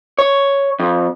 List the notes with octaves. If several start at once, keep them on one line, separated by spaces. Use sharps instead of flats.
C#5
F2